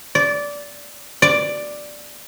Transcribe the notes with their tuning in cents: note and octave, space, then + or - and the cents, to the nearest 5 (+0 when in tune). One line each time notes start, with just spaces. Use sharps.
D5 -15
D5 +5